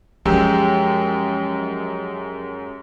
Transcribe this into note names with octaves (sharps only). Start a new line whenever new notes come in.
F#2 F3 G#3 G4 E6